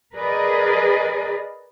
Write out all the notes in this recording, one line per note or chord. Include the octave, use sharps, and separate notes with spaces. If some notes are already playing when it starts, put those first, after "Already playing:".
G#4 A#4 B4 D5 D#5